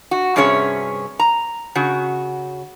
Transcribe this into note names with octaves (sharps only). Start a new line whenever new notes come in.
F#4
G2 C3 C#4 G#4 C#5 E5
A#5
C#3 F#4